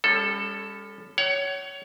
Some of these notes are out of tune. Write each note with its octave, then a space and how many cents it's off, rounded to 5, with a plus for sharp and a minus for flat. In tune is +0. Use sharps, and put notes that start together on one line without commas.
G3 +40 C#4 +0 A4 +0
C#5 +15 F#5 +40